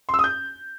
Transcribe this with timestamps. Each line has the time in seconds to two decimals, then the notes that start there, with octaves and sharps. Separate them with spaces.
0.09 C6
0.14 E6
0.19 D#6
0.24 G6